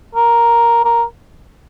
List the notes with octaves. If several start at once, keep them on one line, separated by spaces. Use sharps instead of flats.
A#4
A#4